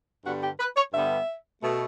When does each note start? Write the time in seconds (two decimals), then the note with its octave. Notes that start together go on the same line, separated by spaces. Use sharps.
0.24 G2 D3 G3 B3 F#4
0.42 G4
0.60 B4
0.77 C#5
0.93 G2 D3 G3 B3 E5
1.62 B2 A3